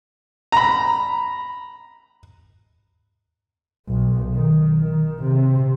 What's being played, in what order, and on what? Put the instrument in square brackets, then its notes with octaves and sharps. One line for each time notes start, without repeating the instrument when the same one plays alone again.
[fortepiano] A#5 B5
[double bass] B1
D#3
D#3
C3